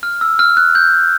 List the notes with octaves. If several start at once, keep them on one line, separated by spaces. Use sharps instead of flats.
F6
E6
F6
F#6
G6